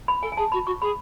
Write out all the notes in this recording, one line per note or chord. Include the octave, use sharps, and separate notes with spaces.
B5
A4 G#5
G#5
G#4 A5
F#4 B5
F#4 C#6
G#4 B5